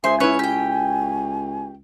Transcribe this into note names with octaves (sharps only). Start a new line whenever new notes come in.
C#2 G#4 C5 E5 G#5 C6
C#4 E4 B4 C#5
G4 G5